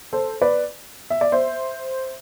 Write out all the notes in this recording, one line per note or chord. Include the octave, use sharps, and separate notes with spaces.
A4 C5
B4 D5
E5
D5
C5 E5